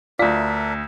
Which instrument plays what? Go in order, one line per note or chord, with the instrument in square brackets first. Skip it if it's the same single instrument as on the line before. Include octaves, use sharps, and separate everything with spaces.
[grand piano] D2 B6 [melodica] D4 A#4 E5 [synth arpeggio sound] F4 D5 F5